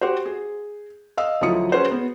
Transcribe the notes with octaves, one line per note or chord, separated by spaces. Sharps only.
F#4 G4 C5
G#4
D#5 F5 E6
D2 F3 F#3 E4 D#6 C#7
C#4 F#4 G#4 B4 C5
B3